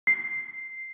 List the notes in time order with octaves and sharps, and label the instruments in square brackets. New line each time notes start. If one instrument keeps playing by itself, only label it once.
[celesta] C7